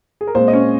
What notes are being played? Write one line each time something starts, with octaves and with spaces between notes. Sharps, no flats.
G#4
A#4
A#2 G#3 C4 C5
D#5
C#4 C#5